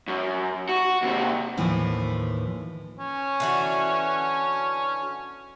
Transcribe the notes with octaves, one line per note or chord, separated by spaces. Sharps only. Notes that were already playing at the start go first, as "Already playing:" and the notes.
F#2
F#4
D#2 C3
D#2 A2 E3 F3
C#4
D3 E3 F#4